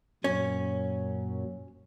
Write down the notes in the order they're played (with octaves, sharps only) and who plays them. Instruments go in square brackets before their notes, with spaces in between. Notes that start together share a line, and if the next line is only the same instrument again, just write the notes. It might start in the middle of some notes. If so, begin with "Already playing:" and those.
[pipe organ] F#2 A#2 F#3 [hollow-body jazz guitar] C#4